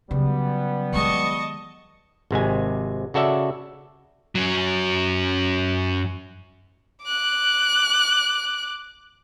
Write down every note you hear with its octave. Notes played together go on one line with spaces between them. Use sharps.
C#3 F#3 G3 B3
D#3 G#3 D#5 A5 C#6
G#1 C3 G#3 G#5
C#3 F#4 A4 D5 E5
F#2 F#3
D6 F#6